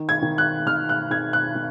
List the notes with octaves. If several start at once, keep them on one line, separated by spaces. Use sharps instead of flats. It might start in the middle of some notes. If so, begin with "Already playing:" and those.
Already playing: D#3
G#6
D#3
F#6
D#3 F6
F#6
D#3 G#6
F#6
D#3